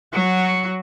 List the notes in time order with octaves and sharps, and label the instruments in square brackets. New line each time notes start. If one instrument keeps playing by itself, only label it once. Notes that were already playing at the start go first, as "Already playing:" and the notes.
[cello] F#3 F#4